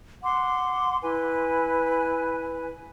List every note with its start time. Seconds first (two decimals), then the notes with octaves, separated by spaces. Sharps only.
0.22 F#5 C6 D6
1.02 E4 B4 G#5